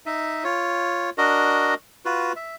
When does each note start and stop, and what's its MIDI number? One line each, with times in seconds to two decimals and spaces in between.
0.06 0.44 63
0.06 0.44 76
0.44 1.10 65
0.44 1.10 73
1.18 1.74 62
1.18 1.74 66
1.18 1.74 70
1.18 1.74 75
2.05 2.33 65
2.05 2.33 66
2.05 2.33 71
2.36 2.56 76